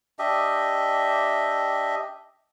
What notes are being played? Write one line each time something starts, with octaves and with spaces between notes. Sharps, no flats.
D4 G4 D#5 E5